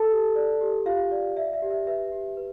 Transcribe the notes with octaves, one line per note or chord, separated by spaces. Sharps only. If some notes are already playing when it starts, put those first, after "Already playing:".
Already playing: A4 A5
G4
D5
G4
F4 G4 F5
D5
D5 E5
E5
G4
E5
B4 E5
G4
B4